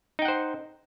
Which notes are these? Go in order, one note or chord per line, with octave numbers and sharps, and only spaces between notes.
D#4 C5 F#5 G5